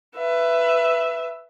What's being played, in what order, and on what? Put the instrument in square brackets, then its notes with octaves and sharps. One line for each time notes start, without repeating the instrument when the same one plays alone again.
[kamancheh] B4 E5